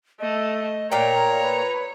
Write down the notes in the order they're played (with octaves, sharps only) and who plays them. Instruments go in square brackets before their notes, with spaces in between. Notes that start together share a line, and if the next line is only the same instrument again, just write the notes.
[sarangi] A3 [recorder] D#5
[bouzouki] A#2 F5 G5 [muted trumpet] A#4 [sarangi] C#5 [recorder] A#5
[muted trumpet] B4